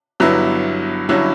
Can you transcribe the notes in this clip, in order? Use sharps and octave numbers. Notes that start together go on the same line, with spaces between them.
G1 G2 F#3 B3 E4
G1 G2 F#3 C#4 E4